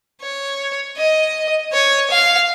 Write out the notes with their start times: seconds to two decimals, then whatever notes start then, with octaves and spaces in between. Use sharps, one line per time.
0.21 C#5
0.97 D#5
1.73 C#5
2.11 F5